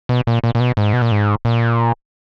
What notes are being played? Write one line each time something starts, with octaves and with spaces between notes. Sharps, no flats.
B2
A#2
A#2
A#2
B2
G#2
B2
A#2
G#2
A#2